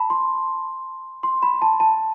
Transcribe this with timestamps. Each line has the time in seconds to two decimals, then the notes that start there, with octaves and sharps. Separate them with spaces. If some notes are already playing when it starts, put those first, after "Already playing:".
Already playing: A5 B5
0.10 C6
1.23 C6
1.42 B5
1.62 A5
1.80 A5